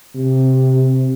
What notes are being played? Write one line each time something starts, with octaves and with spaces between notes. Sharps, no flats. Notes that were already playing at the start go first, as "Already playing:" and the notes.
C3